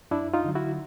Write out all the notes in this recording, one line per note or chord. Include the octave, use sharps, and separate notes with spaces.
F#2 D4 E4
D#4 F4
D3 F#3
E4 F#4